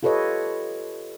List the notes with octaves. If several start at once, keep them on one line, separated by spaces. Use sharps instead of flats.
F4 G4 A4 B4 C#5 D#5